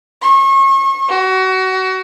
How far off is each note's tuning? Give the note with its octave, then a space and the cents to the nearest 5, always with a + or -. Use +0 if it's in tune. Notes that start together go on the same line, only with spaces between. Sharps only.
C#6 -35
F#4 +25